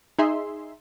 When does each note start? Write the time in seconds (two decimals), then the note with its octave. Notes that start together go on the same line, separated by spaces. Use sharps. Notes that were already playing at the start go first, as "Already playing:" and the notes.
0.19 D#4 G#4 E5 C6